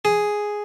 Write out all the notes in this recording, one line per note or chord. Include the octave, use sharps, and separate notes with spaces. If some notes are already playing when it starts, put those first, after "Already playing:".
G#4